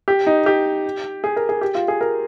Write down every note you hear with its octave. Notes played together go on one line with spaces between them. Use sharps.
G4
D#4
G4
G#4
A#4
G#4
G4
F4
G#4
A#4